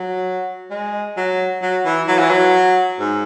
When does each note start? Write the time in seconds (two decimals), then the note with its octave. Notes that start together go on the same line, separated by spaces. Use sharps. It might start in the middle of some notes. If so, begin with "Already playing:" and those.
Already playing: F#3
0.70 G#3
1.17 F#3
1.62 F#3
1.85 E3
2.08 F#3
2.19 E3
2.31 F#3
3.00 G#2